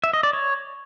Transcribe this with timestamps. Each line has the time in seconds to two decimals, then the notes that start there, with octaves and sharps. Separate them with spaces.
0.04 E5
0.13 D#5
0.23 D5
0.33 C#5